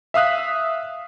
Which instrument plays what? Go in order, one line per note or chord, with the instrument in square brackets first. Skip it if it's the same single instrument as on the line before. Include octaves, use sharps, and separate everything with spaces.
[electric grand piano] E5 F5 D#6 F#6 B6